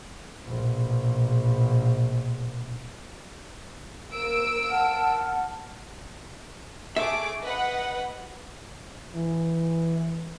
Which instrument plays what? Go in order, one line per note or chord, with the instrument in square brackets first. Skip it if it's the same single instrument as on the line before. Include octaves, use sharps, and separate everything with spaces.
[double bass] A#1 B2
[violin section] A#3 E6 D7 [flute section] A#4
[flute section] F#5 A5 F6
[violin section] A3 G#4 D6 [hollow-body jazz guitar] E5
[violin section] B4 D#5 F#5
[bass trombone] E3